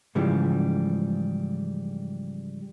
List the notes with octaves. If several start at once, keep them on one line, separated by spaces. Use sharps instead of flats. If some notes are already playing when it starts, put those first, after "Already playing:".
G#2 C#3 E3 F3 G3